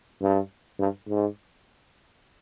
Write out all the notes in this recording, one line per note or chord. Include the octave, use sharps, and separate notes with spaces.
G2
G2
G#2